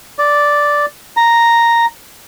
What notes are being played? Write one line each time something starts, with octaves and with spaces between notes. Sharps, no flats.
D5
A#5